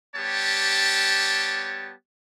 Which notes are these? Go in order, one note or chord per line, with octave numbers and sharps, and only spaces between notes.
G3 B3 G4 C#5 A5